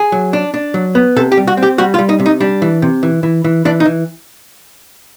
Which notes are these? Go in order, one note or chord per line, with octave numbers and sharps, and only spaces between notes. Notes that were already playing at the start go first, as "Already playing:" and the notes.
Already playing: G#4
F#3
D4
D4
F#3
B3
C3 A4
G4
G3
F#4
C4
G4
G3 F#4
F4
G3
D#4
C3
D#4
G3 D4
E3
C3
E3
E3
E3
E3 D4
D#4
E3